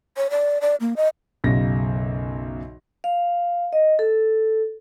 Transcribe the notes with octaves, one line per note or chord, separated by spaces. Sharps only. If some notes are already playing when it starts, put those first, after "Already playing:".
C#5
D5
D5
A#3
D#5
B1 F#2 C#3 A#6
F5
D#5
A4